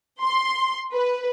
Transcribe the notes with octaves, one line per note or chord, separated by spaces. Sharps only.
C6
B4